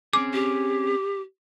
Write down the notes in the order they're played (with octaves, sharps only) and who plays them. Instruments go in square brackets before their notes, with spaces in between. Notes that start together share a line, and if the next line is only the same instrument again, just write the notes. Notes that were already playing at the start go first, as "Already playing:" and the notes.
[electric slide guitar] C4 C#4 G#4 [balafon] D6
[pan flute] G4